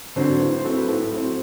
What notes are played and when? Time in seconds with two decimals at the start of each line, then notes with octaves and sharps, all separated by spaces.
0.16 D3 F#3 C4 C5
0.40 A2 B4
0.52 C5
0.64 F#3 C4 A4
0.76 B4
0.88 A2 A4
1.11 F#3 C4